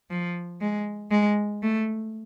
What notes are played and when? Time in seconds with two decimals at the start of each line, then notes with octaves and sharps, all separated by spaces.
0.10 F3
0.61 G#3
1.11 G#3
1.62 A3